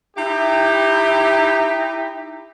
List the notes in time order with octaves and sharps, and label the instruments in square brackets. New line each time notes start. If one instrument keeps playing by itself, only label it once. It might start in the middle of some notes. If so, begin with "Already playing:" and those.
[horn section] D#4 E4 G4